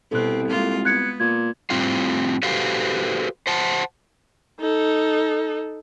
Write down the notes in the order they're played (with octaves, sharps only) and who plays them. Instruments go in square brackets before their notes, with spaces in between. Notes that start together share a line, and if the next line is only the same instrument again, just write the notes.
[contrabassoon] C2 [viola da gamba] B2 C4 [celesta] A4 F#6
[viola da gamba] G#3 A#3 F4
[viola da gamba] B3 [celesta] F#6 G#6 C#7
[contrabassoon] A#2 [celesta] G#6
[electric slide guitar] A2 G3 C4 F4 F5
F#4 G4 A4 B4 C5 F5
C5 F#5 A5
[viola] D#4 A4